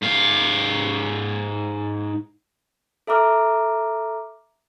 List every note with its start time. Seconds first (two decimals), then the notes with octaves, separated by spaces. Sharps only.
0.02 G#2 F5
3.07 A4 E5 A#5 D6 F6